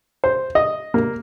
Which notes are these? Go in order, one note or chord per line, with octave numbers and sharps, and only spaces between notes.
C5
D#5
A#3